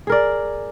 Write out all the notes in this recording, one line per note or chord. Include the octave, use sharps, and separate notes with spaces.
G#4 A#4 D5